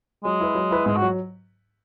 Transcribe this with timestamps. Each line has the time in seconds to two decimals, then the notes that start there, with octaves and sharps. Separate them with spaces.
0.24 F#3 G#3
0.40 E4 B4
0.55 F#3
0.71 E4 B4
0.86 G#2 G#3
0.96 F#4
1.02 F#3